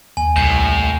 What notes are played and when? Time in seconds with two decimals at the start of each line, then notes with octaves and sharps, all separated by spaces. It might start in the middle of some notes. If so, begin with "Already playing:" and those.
0.17 D#2 G#5
0.36 C2 A2 G6